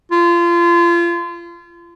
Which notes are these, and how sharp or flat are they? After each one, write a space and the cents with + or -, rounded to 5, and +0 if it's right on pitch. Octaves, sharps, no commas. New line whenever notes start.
F4 -30